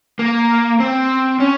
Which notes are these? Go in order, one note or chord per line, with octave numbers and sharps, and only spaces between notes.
A#3
C4
C#4